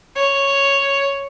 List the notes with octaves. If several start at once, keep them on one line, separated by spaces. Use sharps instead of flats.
C#5